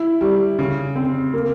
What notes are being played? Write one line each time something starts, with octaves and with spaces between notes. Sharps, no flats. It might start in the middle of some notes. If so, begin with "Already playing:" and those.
Already playing: E4
G3
C#3
C4
A#3